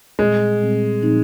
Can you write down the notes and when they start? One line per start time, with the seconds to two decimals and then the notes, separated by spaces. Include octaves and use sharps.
0.19 A#2 G3 G#3 C4
0.61 A#2 G3 C4
1.02 A#2 F3 C4 D#4